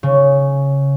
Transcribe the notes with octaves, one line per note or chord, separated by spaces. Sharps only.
C#3